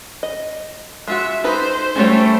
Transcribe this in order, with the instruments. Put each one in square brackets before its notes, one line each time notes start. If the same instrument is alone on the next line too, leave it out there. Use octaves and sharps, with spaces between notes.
[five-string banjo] D#5
[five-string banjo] G#3 F4 F#4 [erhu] E5
[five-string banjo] D#4 A4 B4 [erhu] C5
[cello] G3 A3 [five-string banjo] C#4 F#4 C#5